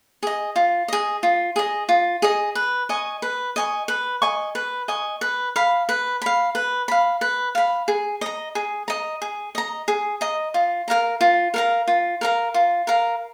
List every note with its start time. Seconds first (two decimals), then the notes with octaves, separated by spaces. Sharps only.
0.23 G#4 D#5
0.56 F4
0.88 G#4 D#5
1.23 F4
1.56 G#4 D#5
1.89 F4
2.22 G#4 D#5
2.55 B4
2.89 D#5 G#5 C#6
3.22 B4
3.56 D#5 G#5 C#6
3.88 B4
4.22 D#5 G#5 C#6
4.55 B4
4.88 D#5 G#5 C#6
5.21 B4
5.56 F5 B5
5.89 B4
6.22 F5 B5
6.55 B4
6.88 F5 B5
7.21 B4
7.55 F5 B5
7.88 G#4
8.21 D#5 A#5
8.55 G#4
8.88 D#5 A#5
9.22 G#4
9.55 D#5 A#5
9.88 G#4
10.21 D#5 A#5
10.54 F4
10.88 A#4 F5 A#5
11.21 F4
11.54 A#4 F5 A#5
11.88 F4
12.21 A#4 F5 A#5
12.54 F4
12.87 A#4 F5 A#5